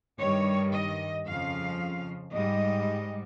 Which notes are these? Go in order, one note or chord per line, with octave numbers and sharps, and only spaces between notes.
G2 D#3 G3 C#5
D#5
F2 C#3 F3 F5
G#2 G3 D#5